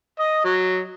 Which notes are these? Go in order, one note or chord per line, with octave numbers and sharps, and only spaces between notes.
D#5
F#3